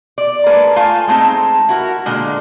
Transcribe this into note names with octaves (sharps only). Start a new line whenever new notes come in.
D5
G#3 A#3 A4 B4
A3 F4 F5 G#5 A5
G#3 A3 C4 D#4 A5
E4 F#4 A#4
A#2 D3 G#3